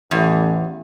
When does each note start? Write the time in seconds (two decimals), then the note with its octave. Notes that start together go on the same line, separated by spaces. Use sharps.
0.11 A1 E2